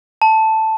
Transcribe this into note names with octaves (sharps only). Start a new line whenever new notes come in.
A5